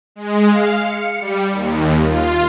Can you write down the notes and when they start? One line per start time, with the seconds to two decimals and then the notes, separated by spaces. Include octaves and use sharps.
0.16 G#3
0.50 F5
0.81 C#7
1.20 G3
1.51 D#2
2.07 F4